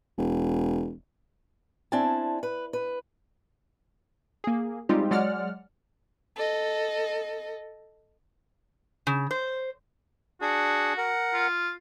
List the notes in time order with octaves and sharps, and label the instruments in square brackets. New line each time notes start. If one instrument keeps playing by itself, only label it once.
[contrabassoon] E1
[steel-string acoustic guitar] C4 D4 E4 G#5 A5
B4
B4
[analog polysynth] A#3 G#4
G3 G#3 C4 D#4 F4 G4
F#3 G#3 D5 F#5 F6
[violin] A4 D#5
[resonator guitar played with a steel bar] C#3
C5
[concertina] D4 G#4 [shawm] F#4
[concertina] A#4 F#5
[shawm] F4